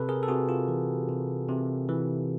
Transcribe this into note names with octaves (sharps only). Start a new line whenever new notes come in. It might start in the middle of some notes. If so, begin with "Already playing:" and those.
Already playing: C3 A4 B4
G#4 A#4
A4
C3 F#4 G#4
F4 G4
E3
C3
C3
E3